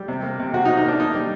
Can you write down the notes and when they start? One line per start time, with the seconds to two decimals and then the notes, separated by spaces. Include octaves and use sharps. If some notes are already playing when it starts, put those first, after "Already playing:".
Already playing: G3
0.08 C3
0.23 A#3
0.39 C3
0.53 C3 F#4
0.65 D#4
0.69 C3
0.77 D#4
0.85 A#3 D4
0.99 A#3 D#4
1.15 G3